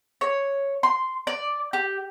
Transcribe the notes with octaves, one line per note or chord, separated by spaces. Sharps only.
C#5
C6
D5
G4